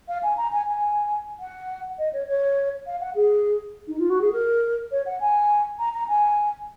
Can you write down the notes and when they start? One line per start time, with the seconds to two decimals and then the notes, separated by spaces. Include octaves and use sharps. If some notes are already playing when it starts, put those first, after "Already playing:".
0.08 F5
0.23 G#5
0.37 A#5
0.52 G#5
0.67 G#5
1.40 F#5
1.99 D#5
2.13 C#5
2.28 C#5
2.86 F5
3.01 F#5
3.15 G#4
3.88 D#4
3.99 F4
4.10 F#4
4.21 G#4
4.32 A#4
4.91 C#5
5.06 F#5
5.20 G#5
5.79 A#5
5.94 A#5
6.08 G#5